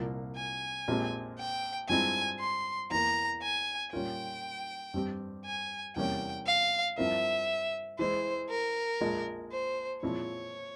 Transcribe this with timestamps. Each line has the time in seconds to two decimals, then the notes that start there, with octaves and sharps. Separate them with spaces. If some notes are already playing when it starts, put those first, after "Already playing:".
Already playing: C2 A#2 F3 A#3
0.36 G#5
0.88 A#1 A#2 G#3 C4 G4
1.39 G5
1.88 G2 F3 G#3 C4 E4 G#5
2.40 C6
2.91 E2 E3 A#3 A#5
3.42 G#5
3.93 A#2 G3 C#4 F4 A#4 G5
4.94 G2 G3 C4 G4
5.45 G#5
5.96 E2 C3 G3 A#3 C#4 G5
6.46 F5
6.98 G2 F3 C4 E4 A#4 E5
7.99 E3 G#3 E4 C5
8.50 A#4
9.01 A#1 A#2 G#3
9.52 C5
10.03 A#2 F3 G#3 C4 E4 C#5